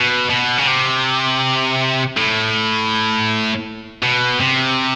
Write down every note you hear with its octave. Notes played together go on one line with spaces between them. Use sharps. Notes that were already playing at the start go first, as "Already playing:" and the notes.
Already playing: B2
B2
C#3
C3
A2
B2
C3